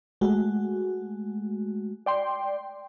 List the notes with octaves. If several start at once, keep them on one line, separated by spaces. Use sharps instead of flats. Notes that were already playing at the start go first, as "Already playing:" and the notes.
G#3 A3 F#4
D5 G5 C6